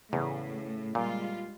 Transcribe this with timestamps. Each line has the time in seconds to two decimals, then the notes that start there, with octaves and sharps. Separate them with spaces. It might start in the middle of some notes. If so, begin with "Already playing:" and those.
0.13 E2 A2 C#3
0.95 A#2 G3 G#3 F4